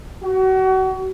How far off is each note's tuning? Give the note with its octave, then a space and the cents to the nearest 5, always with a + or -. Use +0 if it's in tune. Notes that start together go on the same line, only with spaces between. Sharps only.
F#4 +35